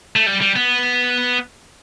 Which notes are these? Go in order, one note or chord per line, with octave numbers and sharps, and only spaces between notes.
A3
G3
G3
B3